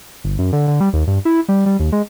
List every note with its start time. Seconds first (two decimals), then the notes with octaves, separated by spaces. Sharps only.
0.24 G1
0.39 F#2
0.53 D3
0.68 D3
0.80 G3
0.93 D#2
1.07 G2
1.25 E4
1.49 G3
1.66 G3
1.80 D#2
1.92 G#3